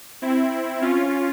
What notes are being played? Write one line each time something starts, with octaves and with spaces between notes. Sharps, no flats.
C4 E4
C#4 F4